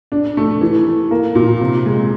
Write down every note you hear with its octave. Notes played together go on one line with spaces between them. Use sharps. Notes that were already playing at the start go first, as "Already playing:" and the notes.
D4
A3
E3
E3
A#3
A#2
C3
G#3